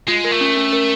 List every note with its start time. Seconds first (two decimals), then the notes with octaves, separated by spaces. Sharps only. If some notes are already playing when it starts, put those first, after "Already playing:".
0.08 G#3 F4
0.24 A#4
0.32 A3
0.41 C#4
0.56 C#4
0.73 A#4